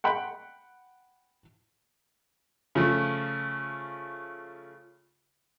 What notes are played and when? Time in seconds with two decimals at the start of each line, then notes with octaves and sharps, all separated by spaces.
0.04 F#5 G5 B5
2.75 C#3 F3 A3